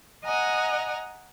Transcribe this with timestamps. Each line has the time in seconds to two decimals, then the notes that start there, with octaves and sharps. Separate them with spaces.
0.25 D#5 F#5 G#5 A#5